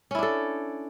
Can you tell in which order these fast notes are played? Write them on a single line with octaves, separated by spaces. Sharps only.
C#4 E4 D4 A4